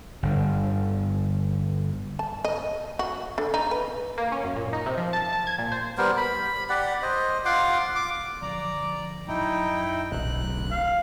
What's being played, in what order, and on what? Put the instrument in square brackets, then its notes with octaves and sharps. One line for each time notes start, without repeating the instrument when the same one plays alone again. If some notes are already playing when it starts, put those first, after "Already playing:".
[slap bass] G1 D3
[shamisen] A5
D#5
F#4
D3
D#4
B4
[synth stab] A#3
C#4
F#2
A#2
D#4
C3
F3
A5
A5
G#6
A#2
C5
[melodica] G3 B3 A#4 C5
B5
G4 D5 F#5
C5 D#5
F4 F#5 C6 D6
D6
[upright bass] D3 F3 [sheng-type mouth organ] D5 A#5
[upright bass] F#2 [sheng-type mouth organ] D#4 E4 G5
[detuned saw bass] D1 [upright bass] B1 B2 [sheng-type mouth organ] F#6
[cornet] F5